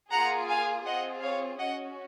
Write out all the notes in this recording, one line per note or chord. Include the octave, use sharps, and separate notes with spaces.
A#3 F4 G#4 F#5 A#5
F5 G#5
C4 F4 G#4 D#5 F#5
C#5 F5
C#4 F#4 D#5 F#5